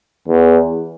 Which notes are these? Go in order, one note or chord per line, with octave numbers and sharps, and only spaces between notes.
E2